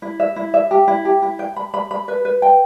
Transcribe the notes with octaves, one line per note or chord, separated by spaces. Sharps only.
E4
E5
E4
E5
G4
E4
G4
E4
G5
B5
B5
B5
B4
B4
G5